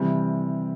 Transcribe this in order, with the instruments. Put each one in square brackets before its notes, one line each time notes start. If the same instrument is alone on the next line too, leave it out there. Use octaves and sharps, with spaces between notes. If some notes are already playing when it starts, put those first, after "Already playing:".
Already playing: [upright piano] C3 E3 G3